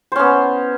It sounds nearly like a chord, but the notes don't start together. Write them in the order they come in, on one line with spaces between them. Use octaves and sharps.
C5 C#4 B3